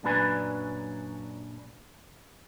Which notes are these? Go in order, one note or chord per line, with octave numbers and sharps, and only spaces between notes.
F#2 A#2 F#3 D4 B4 G#5